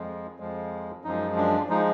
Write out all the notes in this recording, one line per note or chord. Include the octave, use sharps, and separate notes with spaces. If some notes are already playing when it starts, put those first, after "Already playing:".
Already playing: F2 F3 G#3
F2 F3 G#3
F#2 F3 G#3 D#4
D4
F3 G#3 D#4